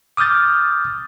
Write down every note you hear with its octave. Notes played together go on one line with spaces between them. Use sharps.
D6 D#6 F6 G6 A6